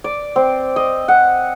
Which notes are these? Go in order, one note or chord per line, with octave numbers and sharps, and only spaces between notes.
D5
C4
D#5
F#5